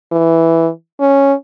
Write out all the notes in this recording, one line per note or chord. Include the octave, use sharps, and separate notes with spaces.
E3
C#4